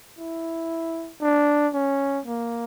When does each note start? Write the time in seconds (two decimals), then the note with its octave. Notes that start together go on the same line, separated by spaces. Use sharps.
0.18 E4
1.22 D4
1.74 C#4
2.26 A#3